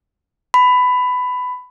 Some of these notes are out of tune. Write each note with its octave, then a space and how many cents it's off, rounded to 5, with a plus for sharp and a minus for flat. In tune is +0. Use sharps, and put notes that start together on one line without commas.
B5 +15